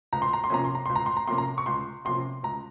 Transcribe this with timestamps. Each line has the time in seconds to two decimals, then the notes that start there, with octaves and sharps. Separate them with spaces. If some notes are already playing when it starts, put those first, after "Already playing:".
0.13 C#2 A#5
0.22 C6
0.33 A#5
0.44 C6
0.50 C3 F3 A#3 C#4 A#5
0.65 C6
0.75 A#5
0.86 C#2 C6
0.96 A#5
1.06 C6
1.17 A#5
1.28 C3 F3 A#3 C#4 C6
1.38 A#5
1.58 C#6
1.66 C#2 C6
2.05 C3 F3 A#3 C#4 C6
2.43 C#2 A#5